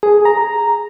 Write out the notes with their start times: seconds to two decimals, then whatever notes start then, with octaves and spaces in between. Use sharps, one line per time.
0.03 G#4
0.25 A#5